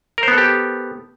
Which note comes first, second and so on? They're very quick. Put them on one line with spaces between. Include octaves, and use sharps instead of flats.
A#4 C5 B3 A4 G4